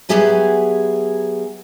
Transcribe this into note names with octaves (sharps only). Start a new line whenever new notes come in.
F#3 B3 G4 G#4 E5 G#5